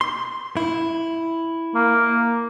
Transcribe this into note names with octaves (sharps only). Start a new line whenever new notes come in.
C6
E4
A#3